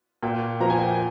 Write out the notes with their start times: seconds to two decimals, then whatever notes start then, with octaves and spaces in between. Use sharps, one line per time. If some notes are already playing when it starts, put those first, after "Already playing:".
0.23 A#2 G5
0.60 F3 A#3 A#5
0.70 G#5
0.79 G5
0.88 G#5